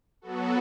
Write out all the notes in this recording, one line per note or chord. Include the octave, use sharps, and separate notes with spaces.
F#3 B3 F#4 A4